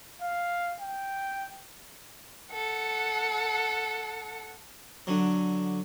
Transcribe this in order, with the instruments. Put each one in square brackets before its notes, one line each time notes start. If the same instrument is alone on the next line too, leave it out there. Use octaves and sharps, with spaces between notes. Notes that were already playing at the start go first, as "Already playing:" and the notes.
[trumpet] F5
G5
[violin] A4 F#5
[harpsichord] D3 F#3